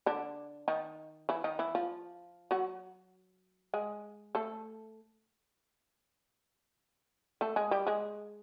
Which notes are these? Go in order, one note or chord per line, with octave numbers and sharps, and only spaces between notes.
D3 D4
D#3 D#4
E3 E4
D#3 D#4
E3 E4
F3 F4
F#3 F#4
G#3 G#4
A3 A4
A3 A4
G#3 G#4
G3 G4
G#3 G#4